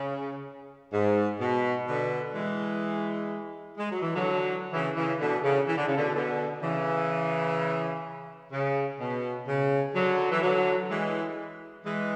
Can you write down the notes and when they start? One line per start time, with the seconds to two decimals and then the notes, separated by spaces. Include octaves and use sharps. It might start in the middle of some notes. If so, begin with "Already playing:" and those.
Already playing: C#3
0.92 G#2
1.40 B2
1.87 B2 D3
2.34 E3 G#3
3.78 G#3
3.90 F#3
4.02 E3
4.15 D3 F#3
4.71 C#3 E3
4.95 C#3 E3
5.19 B2 D3
5.43 C#3
5.67 E3
5.76 D3
5.87 C#3
5.96 B2 D3
6.14 B2 D3
6.61 C#3 E3
8.51 C#3
8.99 B2
9.47 C#3
9.94 D3 F#3
10.31 E3
10.41 D3 F#3
10.89 E3 G#3
11.85 E3 G#3